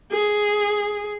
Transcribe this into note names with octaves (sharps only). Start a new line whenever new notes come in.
G#4